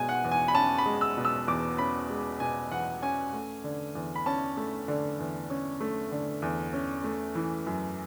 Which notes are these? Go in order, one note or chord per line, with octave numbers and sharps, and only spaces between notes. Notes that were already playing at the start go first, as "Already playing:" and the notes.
Already playing: B2 G#3 G#5
F#5
E2
G#5
B5
C#4 A5
B5
G#3
E6
B2
E6
E2 D6
C#4 B5
G#3
B2 G#5
E2 F#5
C#4 G#5
A3
D3
E2
B5
C#4 A5
A3
D3
E2
C#4
A3
D3
E2
C#4
A3
E3
F#2